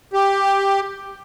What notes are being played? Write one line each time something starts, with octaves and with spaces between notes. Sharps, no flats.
G4